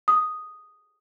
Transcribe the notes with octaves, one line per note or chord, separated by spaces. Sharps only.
D#6